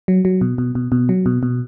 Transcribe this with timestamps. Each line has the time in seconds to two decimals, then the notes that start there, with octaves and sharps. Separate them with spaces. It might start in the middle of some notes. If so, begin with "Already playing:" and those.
0.08 F#3
0.25 F#3
0.41 B2
0.58 B2
0.75 B2
0.92 B2
1.09 F#3
1.26 B2
1.43 B2